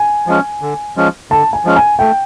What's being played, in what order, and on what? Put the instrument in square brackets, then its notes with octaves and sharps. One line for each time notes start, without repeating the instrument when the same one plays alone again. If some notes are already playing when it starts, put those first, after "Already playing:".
Already playing: [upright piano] G#5
[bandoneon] F3 G#3 C#4
D3
F3 G#3 C#4
[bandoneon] D3 [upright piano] A5
[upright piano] G#5
[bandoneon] F3 G#3 C#4
[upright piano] G#5
[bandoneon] A3 [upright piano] G5